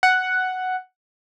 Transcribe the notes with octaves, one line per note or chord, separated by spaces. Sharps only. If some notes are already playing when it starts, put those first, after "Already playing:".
F#5